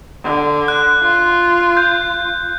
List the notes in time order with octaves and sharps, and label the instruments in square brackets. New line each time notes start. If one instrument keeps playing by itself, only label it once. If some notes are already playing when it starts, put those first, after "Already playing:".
[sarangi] D3
[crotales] F#6
[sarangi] F4
[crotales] G6